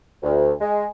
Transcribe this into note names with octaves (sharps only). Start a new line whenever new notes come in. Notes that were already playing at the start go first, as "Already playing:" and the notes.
D2
G#3